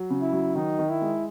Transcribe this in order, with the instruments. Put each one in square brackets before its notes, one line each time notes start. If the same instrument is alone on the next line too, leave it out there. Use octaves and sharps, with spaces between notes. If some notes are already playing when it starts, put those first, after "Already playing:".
Already playing: [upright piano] F#3
C#3
[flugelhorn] E4
[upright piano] F#3
[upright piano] D#3 [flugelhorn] D#4
[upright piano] D#3
[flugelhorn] E4
[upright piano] G#3